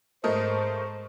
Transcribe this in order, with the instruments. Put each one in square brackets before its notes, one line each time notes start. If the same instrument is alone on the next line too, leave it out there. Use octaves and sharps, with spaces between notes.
[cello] G#2 [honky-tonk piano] A3 A#4 D#5 [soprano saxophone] C5